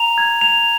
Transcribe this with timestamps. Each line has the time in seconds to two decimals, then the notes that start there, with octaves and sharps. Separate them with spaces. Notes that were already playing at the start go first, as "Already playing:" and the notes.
Already playing: A#5 F7
0.18 G#6
0.41 F7